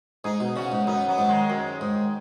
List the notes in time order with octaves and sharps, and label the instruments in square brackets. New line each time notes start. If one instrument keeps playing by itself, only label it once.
[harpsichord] G#2 [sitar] D#4 G#4
[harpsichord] B2
[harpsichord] C#3 [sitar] C#4 F#4
[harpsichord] G#2
[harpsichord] F#2 [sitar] B3 D#4
[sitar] F#3 B3
[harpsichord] G#2
[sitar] D#3 G#3
[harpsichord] F#2
G#2